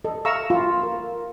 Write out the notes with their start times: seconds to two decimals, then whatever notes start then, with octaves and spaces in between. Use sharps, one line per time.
0.05 A4 D#5
0.25 E5 F5 A#5 C#6 E6
0.50 F4
0.83 A#4